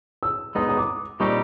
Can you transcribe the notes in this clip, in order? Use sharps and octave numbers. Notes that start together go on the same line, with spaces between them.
E6
G#3 B3 D#4 D#6
D#6
D6
A#2 G3 C4 D#4 G4 C#6